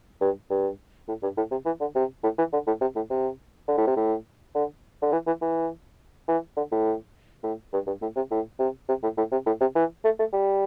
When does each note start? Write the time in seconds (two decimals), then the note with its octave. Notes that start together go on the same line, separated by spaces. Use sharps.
0.21 G2
0.50 G2
1.08 A2
1.23 G2
1.37 A2
1.51 C3
1.66 E3
1.81 D3
1.95 C3
2.23 A2
2.38 E3
2.53 D3
2.67 A2
2.81 C3
2.96 A2
3.11 C3
3.68 D3
3.77 A2
3.87 C3
3.97 A2
4.55 D3
5.02 D3
5.12 E3
5.27 E3
5.42 E3
6.28 E3
6.57 D3
6.72 A2
7.44 A2
7.73 G2
7.87 G2
8.02 A2
8.16 C3
8.31 A2
8.59 C3
8.89 C3
9.03 A2
9.18 A2
9.32 C3
9.46 A2
9.61 C3
9.75 E3
10.04 A3
10.19 A3
10.33 G3